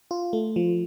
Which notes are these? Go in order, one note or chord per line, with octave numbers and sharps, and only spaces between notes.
F4
A3
F3